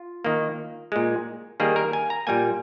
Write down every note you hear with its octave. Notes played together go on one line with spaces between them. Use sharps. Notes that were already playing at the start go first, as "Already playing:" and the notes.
Already playing: F4
D#3 A#3
A#2 G#3
D#3 G3 A#3 G#4
A#4
G#5
A#5
A#2 G3 A#3 G#5